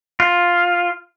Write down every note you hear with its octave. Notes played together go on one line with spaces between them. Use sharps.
F4